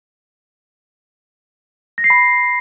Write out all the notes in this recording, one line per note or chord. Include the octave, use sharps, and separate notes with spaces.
A#6
C7
B5